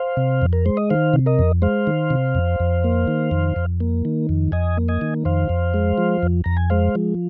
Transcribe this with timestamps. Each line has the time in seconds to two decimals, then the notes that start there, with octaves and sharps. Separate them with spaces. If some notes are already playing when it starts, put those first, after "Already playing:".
Already playing: C5 F5
0.17 C3
0.42 F2
0.53 A#4
0.66 G#3 C5
0.77 D#5
0.90 D#3 C5 F5
1.14 C3
1.26 A#4 D#5
1.39 F2
1.62 G#3 C5 F5
1.87 D#3
2.10 C3
2.35 F2
2.60 F2
2.84 A#3
3.08 D#3
3.31 F2
3.56 F2
3.80 A#3
4.05 D#3
4.29 F2
4.52 F2 D#5 G#5
4.77 A#3
4.88 D#5 G#5
5.01 D#3
5.25 F2 C5 F5
5.49 F2
5.74 G#3
5.98 F3
6.23 F2
6.44 F2 A#5
6.57 G#5
6.70 G#3 C5 F5
6.95 F3